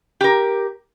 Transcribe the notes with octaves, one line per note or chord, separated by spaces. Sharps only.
G4 A#4